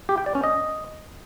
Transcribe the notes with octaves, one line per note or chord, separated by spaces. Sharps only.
G4
G5
D5
C#4
D#5